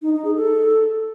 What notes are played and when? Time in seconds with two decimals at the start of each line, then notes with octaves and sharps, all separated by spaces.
0.02 D#4
0.13 D#4
0.24 G#4
0.35 A4